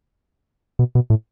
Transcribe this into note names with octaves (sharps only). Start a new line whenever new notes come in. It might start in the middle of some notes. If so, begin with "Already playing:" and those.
B2
B2
A2